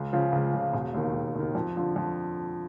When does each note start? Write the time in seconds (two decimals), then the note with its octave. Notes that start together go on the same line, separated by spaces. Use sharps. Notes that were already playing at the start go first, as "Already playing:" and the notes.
Already playing: C#2
0.13 C#3 F3
0.32 C#2
0.53 C#3 F3
0.73 E1
0.94 D#2 D#3
1.14 E1
1.35 D#2 D#3
1.55 F2
1.76 D3 F3
1.96 F2